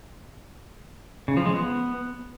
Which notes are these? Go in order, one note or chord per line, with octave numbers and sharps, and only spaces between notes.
C#3
F3
G#3
B3